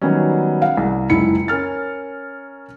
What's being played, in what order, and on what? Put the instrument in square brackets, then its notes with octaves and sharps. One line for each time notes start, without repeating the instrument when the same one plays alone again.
[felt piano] D#3 F#3 G3 B3 C#4
F5 F#5
C2
F#1 C#2 E4 C#7
C#4 A#4 F6 A6